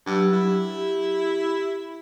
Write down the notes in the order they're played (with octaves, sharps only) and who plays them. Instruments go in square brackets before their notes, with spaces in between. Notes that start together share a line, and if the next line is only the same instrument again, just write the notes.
[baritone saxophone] G2 [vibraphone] F#3 G4 E6
[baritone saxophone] E4
[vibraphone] G4